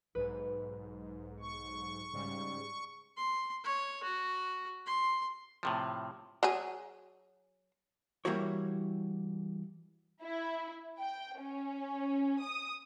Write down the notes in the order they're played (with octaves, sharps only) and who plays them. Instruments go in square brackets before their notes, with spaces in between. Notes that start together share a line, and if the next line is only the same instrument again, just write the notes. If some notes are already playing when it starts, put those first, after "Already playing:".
[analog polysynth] B1 G#2 [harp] B4
[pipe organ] C#6
[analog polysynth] G#2 C#3 G3
[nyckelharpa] C6
C#5
F#4
C6
[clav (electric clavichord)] A2 C3 F3
[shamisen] F#3 G#4
[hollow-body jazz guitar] E3 G3 A#3 E4 F#4 C#5
[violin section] E4
G5
C#4
D#6